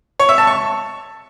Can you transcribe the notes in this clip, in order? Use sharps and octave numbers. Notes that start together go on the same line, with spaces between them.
C#5
E5
A5
C#6